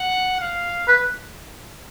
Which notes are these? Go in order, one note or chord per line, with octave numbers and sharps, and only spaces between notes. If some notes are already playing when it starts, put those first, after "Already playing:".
Already playing: F#5
F5
B4